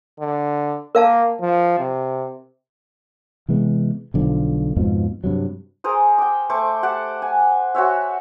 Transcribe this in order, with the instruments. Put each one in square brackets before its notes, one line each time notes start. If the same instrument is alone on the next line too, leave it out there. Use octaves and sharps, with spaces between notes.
[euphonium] D3
[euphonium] A#3 [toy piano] A#4 F5 A5
[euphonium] F3
C3
[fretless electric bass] C3 E3 G#3 B3
B1 D3 F3
F2 G#2 B2 F3
G2 C3 F#3
[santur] G#4 A#4 C5 D#6
G5 D6
A3 C5 C#6 D6
G4 F#5 A5 D6
G#5
F#4 C5 C#5 E5